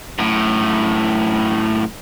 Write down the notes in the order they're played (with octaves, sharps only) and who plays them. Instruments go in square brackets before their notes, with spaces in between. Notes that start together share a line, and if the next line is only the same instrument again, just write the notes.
[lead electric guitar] F#2 A2